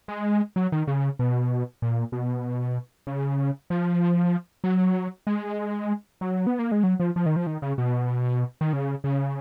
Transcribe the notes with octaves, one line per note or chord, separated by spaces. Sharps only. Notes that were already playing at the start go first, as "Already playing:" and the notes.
G#3
F#3
D#3
C#3
B2
A#2
B2
C#3
F3
F#3
G#3
F#3
B3
A#3
G#3
F#3
F3
F3
D#3
F3
D#3
C#3
B2
D#3
C#3
C#3